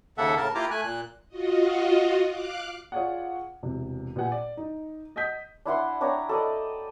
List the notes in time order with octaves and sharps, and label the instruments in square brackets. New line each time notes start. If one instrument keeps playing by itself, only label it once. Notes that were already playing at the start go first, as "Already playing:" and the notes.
[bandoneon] D#2 C#3 A#3 A4 E5 F#5
A2 C#3 A#4 A5
A#3 E4 F4 G4 A#5 D6
A3 G#5 F#6
A#2 F#6
[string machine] F4 F#4 D#5
F5 D6 F#6
[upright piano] F4 G#4 C#5 D5 F5 F#5
E1 C3 E3
A#2 B3 G4 F#5 G#5
D5
D#4
D#5 F#5 D#6 G6 B6
[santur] D4 E4 F#5 C6
D4 C#5 G5 A#5
A4 D5 D#5